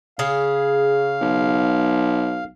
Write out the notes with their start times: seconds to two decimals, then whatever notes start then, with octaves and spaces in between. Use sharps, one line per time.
0.19 C#3 G#4 F5
1.21 B1